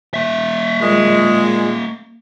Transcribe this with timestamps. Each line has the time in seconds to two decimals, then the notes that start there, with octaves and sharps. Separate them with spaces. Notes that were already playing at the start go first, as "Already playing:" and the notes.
0.14 A#3 E5
0.81 A#2 G#3